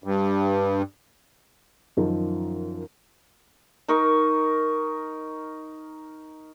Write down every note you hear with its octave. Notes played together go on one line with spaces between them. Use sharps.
G2
F#2 D#3 F3 A#4
D#4 A#4 C#6